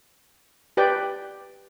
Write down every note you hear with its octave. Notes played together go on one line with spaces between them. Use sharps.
G4 B4 D5 G5